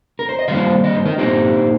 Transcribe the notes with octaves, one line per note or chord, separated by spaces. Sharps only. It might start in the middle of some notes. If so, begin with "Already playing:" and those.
A#4
C5
D#5
D#3 G3 A#3 C5 F5
D#5
C5
A#4 D#5
A#2 A#3 D#4 G4 C5